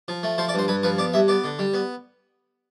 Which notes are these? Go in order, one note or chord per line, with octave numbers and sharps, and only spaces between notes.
F3
A3
F3 C5
D5
G2 C5
G2 B4
F3 B4
B3 D5
G2 E5
B3 D5
D3
G3
B3